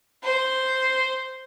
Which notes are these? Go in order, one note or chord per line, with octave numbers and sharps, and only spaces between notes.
C5